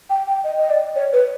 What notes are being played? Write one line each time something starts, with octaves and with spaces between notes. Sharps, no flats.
G5
G5
D#5
D#5
D5
C#5
B4